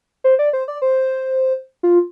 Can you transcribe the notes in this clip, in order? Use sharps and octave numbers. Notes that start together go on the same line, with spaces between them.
C5
D5
C5
D5
C5
F4